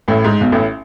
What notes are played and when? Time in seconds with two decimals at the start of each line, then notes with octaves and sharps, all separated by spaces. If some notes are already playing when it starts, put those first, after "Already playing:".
0.08 A1 A2
0.24 G#2
0.41 B1 B2
0.52 A1 A2